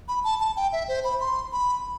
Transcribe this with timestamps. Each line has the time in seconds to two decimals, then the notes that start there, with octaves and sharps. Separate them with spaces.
0.08 B5
0.24 A5
0.40 A5
0.57 G5
0.72 E5
0.88 C5
1.04 B5
1.20 C6
1.52 B5